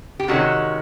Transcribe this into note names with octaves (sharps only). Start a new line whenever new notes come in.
G4
C3 D#3 G#3 C#4 F#4